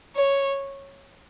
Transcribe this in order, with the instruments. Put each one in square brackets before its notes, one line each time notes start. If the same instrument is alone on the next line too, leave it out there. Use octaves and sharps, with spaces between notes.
[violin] C#5